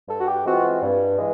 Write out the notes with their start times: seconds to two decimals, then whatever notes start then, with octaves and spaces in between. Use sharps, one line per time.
0.08 G2 A4
0.19 F#4
0.27 G4
0.45 E3 G#3 C4 F4 F#4
0.82 G2
1.18 E3 G#3